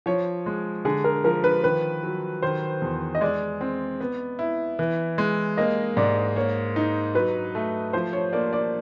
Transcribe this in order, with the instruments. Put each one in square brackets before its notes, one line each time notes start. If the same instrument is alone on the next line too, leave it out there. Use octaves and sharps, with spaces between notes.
[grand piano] F3 [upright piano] C#5
[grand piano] G#3
[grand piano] D3 [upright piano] G#4
[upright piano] A#4
[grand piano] F3 [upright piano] A#4
[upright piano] B4
[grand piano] D#3 [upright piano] B4
[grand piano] F#3
[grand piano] D#3 [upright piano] C5
[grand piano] E2
[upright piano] D#5
[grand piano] G#3 [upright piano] D5
[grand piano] C4
B3
E4
E3
G#3
[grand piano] A#3 [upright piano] D#5
[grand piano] G#2 [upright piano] D5
[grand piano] A#3 [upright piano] C#5
[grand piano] D#4
[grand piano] F#3 [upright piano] B4
[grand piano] A3
[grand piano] F3 [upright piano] C5
[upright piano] C#5
[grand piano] A#3 [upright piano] D5
[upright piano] D5